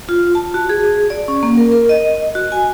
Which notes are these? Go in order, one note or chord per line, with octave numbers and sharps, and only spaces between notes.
F4
A5
F#4
G#4
D5
C#4
A#3
A#4
A#4
D#5
F#4
G#5